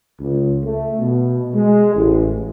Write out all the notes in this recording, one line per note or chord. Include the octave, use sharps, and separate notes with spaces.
C#2
A3
B2
G#3
A1